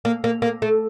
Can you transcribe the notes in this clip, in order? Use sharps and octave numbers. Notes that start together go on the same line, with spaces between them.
A#3
A#3
A#3
A3